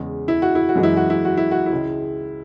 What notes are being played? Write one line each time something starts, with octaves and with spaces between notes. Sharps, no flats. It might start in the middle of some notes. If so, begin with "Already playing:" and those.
Already playing: E2 C#3 G#3
E4
F#4
E4
F#4
F#2 E3 G#3
E4
F#4
E4
F#4
E4
F#4
E4
C#2 C#3 G#3